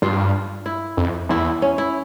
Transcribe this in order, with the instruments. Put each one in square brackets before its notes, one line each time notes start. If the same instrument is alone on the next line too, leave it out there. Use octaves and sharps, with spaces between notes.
[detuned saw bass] G2 [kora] F4
[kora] E4
[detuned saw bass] F2
[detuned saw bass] E2 [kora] E4
[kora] C#4
E4